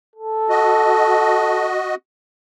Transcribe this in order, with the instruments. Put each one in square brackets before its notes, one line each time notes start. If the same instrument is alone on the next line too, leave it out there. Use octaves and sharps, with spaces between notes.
[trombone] A4
[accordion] F#4 D#5